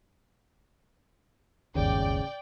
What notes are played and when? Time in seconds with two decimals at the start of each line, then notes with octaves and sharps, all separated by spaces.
1.75 D1 G1 D#2 C#3 D5 G5